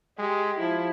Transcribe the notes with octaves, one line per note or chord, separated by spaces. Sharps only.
G#3 G4
F3 E4